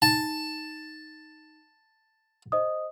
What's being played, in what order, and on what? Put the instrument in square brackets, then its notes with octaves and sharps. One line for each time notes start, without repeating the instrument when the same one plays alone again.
[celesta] D#4 [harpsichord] A5
[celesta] C5 D#5 D#6